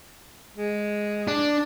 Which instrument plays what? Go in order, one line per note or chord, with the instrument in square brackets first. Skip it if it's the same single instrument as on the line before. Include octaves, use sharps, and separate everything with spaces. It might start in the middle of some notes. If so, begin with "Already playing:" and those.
[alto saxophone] G#3
[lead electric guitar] D4